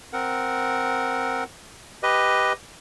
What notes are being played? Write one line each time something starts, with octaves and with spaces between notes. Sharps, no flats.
C4 A#4 F#5
G4 B4 D#5